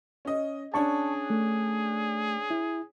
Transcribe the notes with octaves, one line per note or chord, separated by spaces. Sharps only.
C#4 D#5
C#4 D4 G#4 C#5 A5 C#6
A3
E4